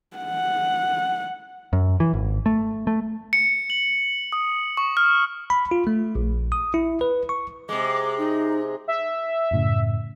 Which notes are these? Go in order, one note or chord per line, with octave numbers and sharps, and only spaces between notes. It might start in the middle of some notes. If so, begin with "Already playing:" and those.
F#5
F#2
E3
G#1
A3
A3
C#7
F#7
D#6
C#6
F6
B5
F4
A3
A#1
D#6
E4
B4
C#6
C3 G#3 D6
D#4
E5
F#2 A2 C#3